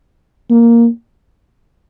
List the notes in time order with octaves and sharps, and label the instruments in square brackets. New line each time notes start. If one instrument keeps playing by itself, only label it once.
[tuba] A#3